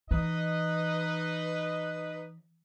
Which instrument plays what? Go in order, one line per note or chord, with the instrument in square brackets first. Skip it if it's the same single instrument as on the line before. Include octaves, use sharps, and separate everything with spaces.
[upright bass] E3 [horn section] D#4 B4 D#5